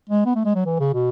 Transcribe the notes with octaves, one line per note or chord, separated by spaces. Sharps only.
G#3
B3
A3
G#3
F#3
E3
C#3
B2